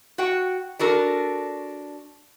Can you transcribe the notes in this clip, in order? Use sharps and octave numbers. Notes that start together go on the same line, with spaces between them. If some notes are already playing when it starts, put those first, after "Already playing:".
F#4 F#5 G5
D4 F#4 A4 A#4